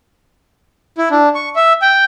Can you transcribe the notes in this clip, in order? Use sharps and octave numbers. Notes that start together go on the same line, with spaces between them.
E4
D4
C#6
E5
G5